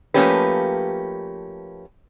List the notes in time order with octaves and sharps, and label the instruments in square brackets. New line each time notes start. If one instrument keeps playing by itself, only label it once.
[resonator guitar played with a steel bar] F3 A3 A#3 C#4 G4 B4